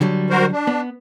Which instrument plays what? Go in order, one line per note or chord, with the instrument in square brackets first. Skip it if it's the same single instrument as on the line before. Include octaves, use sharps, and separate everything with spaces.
[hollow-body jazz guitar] D3 F#3 G3
[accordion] F#4 A#4 C5
D4
[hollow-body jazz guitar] B3